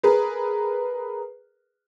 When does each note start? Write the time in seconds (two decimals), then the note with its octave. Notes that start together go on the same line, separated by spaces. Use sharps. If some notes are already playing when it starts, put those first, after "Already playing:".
0.03 G#4 A#4 B4